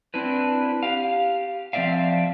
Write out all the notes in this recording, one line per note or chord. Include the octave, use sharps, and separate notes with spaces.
C4 D4 E4 B4
G4 F5
F3 C4 D#4 D5 E5 F5